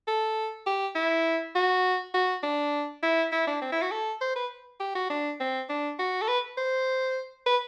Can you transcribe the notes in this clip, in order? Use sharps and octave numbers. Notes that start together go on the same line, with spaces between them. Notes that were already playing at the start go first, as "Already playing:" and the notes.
A4
G4
E4
F#4
F#4
D4
E4
E4
D4
C4
E4
F#4
A4
C5
B4
G4
F#4
D4
C4
D4
F#4
A4
B4
C5
B4